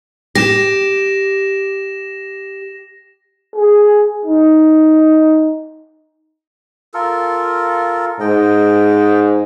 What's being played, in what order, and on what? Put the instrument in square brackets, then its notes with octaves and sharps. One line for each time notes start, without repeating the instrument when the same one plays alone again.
[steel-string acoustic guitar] G4 [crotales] A#6 E7
[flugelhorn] G#4
D#4
[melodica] F4 A4 A#4
[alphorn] G#2 [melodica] D#5 G5